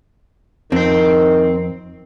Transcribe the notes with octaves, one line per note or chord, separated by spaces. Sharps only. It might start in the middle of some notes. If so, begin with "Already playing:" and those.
F2 D#3 C4 C5